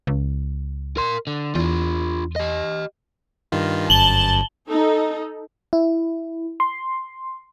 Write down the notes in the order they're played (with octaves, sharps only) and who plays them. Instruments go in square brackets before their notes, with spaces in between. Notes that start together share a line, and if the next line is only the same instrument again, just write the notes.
[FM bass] C#2
[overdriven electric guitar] A#4 C6
D3
[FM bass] E2 [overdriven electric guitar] D4 F4
[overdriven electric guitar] G4 D#5
[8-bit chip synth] G2 D#3 F4
[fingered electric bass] G1 [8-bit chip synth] F#2 [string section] A5 [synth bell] F#7 G7
[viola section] D#4 A4
[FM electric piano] E4
C6